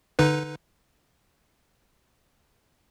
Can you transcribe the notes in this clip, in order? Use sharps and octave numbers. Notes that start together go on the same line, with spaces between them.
D3 D#4 B4